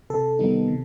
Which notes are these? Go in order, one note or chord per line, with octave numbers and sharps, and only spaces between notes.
C3 A4
D#3 G3 B3 D#4
C3